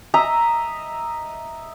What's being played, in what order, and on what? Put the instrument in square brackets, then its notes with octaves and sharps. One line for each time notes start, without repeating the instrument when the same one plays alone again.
[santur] D#5 E5 A#5